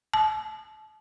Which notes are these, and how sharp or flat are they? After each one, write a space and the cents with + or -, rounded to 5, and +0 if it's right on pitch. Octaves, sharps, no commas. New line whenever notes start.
A5 -35